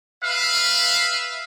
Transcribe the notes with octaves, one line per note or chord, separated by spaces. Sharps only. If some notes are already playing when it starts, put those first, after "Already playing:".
B4 E5 F5